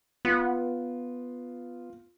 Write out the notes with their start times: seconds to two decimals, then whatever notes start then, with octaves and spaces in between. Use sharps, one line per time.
0.25 B3 F4